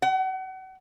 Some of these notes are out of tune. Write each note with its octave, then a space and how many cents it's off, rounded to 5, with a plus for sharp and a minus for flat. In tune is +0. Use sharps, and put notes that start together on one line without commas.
F#5 +35